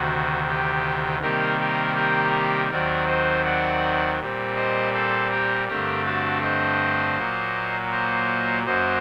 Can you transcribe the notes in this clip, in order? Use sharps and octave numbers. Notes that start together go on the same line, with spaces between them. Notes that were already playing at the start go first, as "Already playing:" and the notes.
Already playing: D2 C3 D#3 F#4
G4
C3 D#3 G3 A#3 G4 A#4
G4 A#4
G4 A#4
D#2 D#3 F#3 C4 A#4 D5
C5 D#5
D5 F#5
A#2 G3 C4
C5 D#5
A4 C5
G4 A#4
G2 D3 A3 C4 G4 A#4
F#4 A4
C5 D#5
A#2 F#3 A#3
C5 D#5
F#2 F#3 A#3 C5 D#5